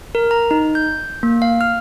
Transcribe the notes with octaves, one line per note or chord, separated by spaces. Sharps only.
A#4
A#5
D#4
G6
A#3
F5
F6